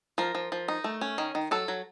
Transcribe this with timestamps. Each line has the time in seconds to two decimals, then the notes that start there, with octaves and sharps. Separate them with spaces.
0.18 F3 A#4
0.35 F3
0.52 F3
0.68 D#4
0.84 A3
1.01 C#4
1.18 D#3
1.35 D#3
1.51 F#3 A4
1.68 F#3